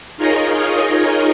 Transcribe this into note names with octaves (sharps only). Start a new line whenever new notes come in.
D#4 F4 G#4 A#4 C#5 D#5